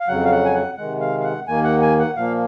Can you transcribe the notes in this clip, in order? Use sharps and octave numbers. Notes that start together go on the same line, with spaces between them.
F5
F2 C#3 F#3 F#5
F5
F#5
G#5
F#5
C3 D#3 G#3 F#5
F5
F5
F#5
D#2 D#3 A#3 G#5
F#5
G#5
F#5
A#2 F3 A#3 F5